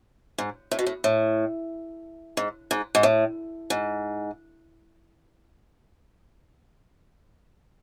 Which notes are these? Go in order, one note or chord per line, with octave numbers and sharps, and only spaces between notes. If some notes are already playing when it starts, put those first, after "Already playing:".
G#2
A2
B2
A2
A2
G#2
G#2
G#2
A2
G#2